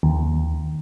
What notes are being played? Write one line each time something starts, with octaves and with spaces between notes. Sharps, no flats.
D#2